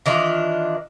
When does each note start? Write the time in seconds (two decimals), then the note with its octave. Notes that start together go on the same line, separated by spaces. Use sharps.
0.06 D#3 E3 D4 F4